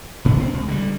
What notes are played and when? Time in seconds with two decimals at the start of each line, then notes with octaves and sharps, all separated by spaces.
0.25 F1 G#2 B3 D4
0.40 C4
0.54 C#2
0.68 D3 D#3 G3